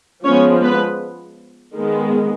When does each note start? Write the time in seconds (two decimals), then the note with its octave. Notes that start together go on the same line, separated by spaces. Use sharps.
0.25 F3 G#3 B3 C#4 C#5
0.63 B3 B4
1.74 D#3 G#3 B3